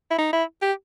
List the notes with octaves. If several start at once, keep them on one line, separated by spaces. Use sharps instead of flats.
E4
D#4
E4
G4